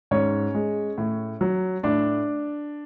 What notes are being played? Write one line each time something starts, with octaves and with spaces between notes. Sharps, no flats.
G#2 C#4 C#5
G#3
A2
F#3
A2 D4 D5